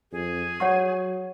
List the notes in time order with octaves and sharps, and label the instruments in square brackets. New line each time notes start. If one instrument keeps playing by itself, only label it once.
[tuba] F2 [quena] G#4
[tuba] F#3 [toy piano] C#5 F#5 C#6